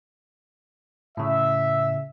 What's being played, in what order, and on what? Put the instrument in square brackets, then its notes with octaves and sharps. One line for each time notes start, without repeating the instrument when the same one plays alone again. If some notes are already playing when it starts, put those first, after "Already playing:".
[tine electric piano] A2 C#3 [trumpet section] E5